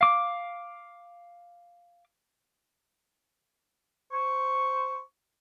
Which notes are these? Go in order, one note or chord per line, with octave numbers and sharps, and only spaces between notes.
F5 D6
C5 C#6